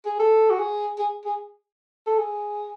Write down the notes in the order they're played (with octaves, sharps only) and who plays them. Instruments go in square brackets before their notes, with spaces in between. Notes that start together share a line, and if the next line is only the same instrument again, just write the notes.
[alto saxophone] G#4
A4
F#4
G#4
G#4
G#4
A4
G#4